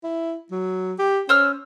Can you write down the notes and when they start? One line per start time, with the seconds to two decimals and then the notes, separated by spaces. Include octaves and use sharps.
0.03 E4
0.51 F#3
0.99 G4
1.29 C#4 C5 E6 F6